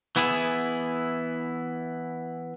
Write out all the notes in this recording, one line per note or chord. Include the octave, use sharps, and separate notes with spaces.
E3 B3 E4 G#4